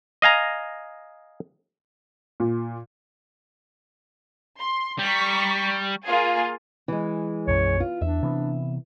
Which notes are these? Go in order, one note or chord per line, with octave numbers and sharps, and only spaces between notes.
D#5 F5 G#5 A#5
A#2
C6
G3 A#5 C#6 B6
A#3 F4 G#4
E3 G#3
B1 F#2 C#5
F4
E2 D4 E5
C3 E3 B3